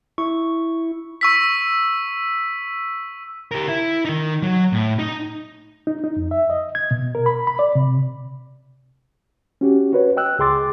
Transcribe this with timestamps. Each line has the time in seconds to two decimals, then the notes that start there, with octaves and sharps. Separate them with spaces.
0.18 E4 C#6
1.21 C#6 E6 B6
3.51 G4 A#4
3.69 E4
4.05 D#3 D#4
4.42 F#3
4.73 A2
4.99 D#4
5.87 D#4
6.04 D#4
6.16 F2
6.31 E5
6.50 D#5
6.75 G#6
6.91 B2
7.15 A#4
7.26 B5
7.47 B5
7.59 D5
7.75 C3
9.61 C#4 F#4 G4
9.93 F#4 B4 C#5
10.17 D#5 G5 E6 F#6
10.39 C#2 G#4 G5 C6 D6 A6